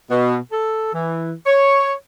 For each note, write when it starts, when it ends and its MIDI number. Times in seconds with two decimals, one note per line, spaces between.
0.11 0.36 47
0.52 0.91 69
0.93 1.32 52
1.46 1.92 73